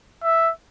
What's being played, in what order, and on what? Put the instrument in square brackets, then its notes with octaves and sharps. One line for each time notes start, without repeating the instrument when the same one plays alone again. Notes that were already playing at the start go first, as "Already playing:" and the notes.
[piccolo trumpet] E5